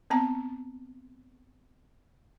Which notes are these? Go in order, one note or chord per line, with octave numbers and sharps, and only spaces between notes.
B3 C4 A5 A#5